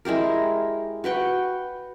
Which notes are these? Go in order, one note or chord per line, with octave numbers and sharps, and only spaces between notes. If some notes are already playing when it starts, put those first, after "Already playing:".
G#3 E4 G4 A#4
F#4 B4 G5 C#6